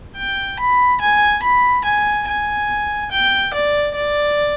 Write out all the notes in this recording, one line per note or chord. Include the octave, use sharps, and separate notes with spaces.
G5
B5
G#5
B5
G#5
G#5
G5
D5
D5